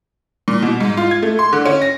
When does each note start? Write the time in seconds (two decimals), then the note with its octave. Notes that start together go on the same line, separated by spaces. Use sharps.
0.48 A#2
0.62 B2
0.80 G#2
0.97 F4
1.11 G#6
1.22 A3
1.39 C6
1.53 D3
1.66 C#4
1.82 A#6